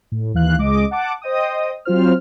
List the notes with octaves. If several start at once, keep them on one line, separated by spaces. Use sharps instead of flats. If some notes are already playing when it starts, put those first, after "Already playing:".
A2
D#2 E3 F5 F#6
C#2 G#3 D#5 D6
F#5 A5 D6
C5 D#5 G5 D#6
F#3 C4 F4 C5 F6